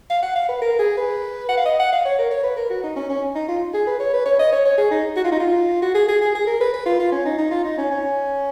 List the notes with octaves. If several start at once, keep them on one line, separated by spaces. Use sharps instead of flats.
F5
F#5
F5
B4
A#4
G#4
B4
F#5
F5
D#5
F#5
F5
C#5
A#4
C#5
B4
A#4
F#4
D#4
C#4
C#4
D#4
F4
G#4
B4
C#5
B4
C#5
D#5
C#5
C#5
G#4
D#4
F#4
F4
D#4
F4
F#4
G#4
G#4
G#4
G#4
A#4
B4
B4
F4
F4
C#4
D#4
D#4
F4
D#4
C#4
C#4